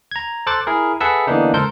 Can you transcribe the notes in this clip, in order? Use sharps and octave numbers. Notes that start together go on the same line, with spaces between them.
A#5 G#6
A4 C5 D6 F#6 A6
E4 G#4 A#4
G#4 A4 B4 E5 F#5 E6
D3 E3 A#3 B3 D4 D#4
C#2 A4 A#4 C5 G6